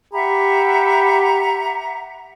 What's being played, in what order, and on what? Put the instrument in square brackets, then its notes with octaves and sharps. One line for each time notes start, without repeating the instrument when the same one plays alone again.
[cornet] G4 [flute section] E5 F#5 A#5 [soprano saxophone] B5